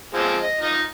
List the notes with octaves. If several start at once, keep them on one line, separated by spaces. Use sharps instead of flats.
F3 G#3 C4
D#5
D#4 F4 D#5